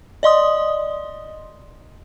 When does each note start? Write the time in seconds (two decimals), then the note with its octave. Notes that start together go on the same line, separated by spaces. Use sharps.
0.23 D5 D#5 C6 D#6